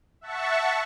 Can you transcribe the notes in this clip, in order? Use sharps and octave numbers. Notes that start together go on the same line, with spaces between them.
E5 F#5 A5 C#6